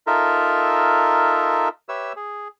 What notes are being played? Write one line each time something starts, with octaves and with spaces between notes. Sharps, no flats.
D#4 F4 A4 A#4 E5
G4 B4 C#5 E5 E6
G#4